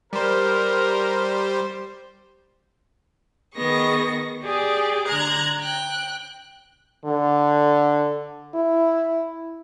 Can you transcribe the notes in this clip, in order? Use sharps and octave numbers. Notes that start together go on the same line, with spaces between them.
G3 A#4 C5
D#3 B3 G#4 C#6 A#6
G4 G#4 D5
D3 A#5 F#6 G#6 A#6
G5 F#6
D3
E4